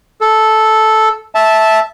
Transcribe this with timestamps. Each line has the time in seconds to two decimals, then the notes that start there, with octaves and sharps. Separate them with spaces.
0.21 A4
1.35 E5 A5